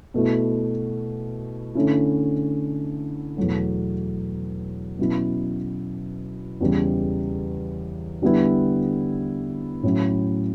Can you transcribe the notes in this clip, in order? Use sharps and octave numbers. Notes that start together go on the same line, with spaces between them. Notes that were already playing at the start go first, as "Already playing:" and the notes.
B2 A3 E4
D3 A3 C#4 E4
E2 B2 F#3 A3
B2 F#3 C#4 E4
E2 C#3 E3 G3
D3 G3 B3 E4
A2 F#3 C#4 E4